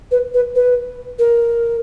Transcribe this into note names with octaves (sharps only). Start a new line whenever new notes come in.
B4
B4
B4
A#4